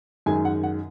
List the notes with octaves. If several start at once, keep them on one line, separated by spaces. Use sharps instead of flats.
F#2 D#3 G#3 G#5
F#5
F#5